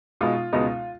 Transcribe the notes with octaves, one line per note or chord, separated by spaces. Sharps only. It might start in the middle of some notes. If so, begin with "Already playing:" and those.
B2 G#3 B3 D#4 F4
C#2 B2 G#3 B3 D#4